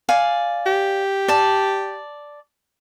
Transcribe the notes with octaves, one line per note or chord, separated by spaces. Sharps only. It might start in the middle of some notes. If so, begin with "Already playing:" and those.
D5 F5 G#5
G4
D5 A5